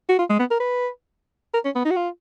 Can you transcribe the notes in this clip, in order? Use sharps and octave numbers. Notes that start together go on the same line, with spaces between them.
F#4
F4
G#3
B3
A#4
B4
A#4
C#4
B3
D#4
F#4
F4